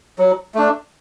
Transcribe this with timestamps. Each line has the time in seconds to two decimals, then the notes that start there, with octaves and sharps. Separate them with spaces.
0.19 F#3
0.55 A3 D4